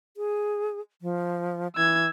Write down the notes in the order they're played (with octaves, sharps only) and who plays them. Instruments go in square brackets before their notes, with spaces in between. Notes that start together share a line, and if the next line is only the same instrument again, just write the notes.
[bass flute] G#4
F3
[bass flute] E3 [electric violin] E6 G#6